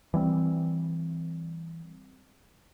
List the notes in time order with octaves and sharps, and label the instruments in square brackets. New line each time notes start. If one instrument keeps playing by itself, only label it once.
[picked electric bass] E3 G3 C4